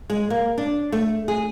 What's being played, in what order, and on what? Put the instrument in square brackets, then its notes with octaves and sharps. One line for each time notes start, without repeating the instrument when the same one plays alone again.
[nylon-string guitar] G#3
A#3
D4
A3
G#4